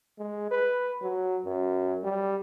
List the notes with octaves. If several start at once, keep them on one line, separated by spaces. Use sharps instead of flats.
G#3
B4
F#3
F#2
G3